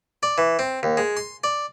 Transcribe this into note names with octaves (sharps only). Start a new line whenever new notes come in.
D5
E3
C4
D#2
G#3
C6
D5